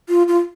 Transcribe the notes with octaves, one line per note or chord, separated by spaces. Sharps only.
F4
F4